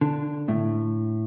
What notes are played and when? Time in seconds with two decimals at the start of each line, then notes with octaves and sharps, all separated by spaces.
0.01 D3
0.48 A2